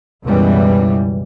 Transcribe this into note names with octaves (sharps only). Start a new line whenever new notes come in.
C#2 F#2 B2 E3 G3